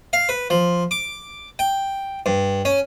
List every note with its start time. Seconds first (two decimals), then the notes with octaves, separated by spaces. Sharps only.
0.13 F5
0.29 B4
0.50 F3
0.91 D6
1.59 G5
2.26 G2
2.65 C#4